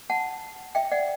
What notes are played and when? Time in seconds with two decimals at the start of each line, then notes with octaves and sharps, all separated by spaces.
0.10 F#5 A5
0.75 E5 G5
0.91 D5 F#5